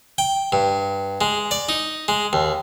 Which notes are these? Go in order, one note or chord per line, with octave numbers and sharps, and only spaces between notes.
G5
G2
G#3
D5
D#4
G#3
D#2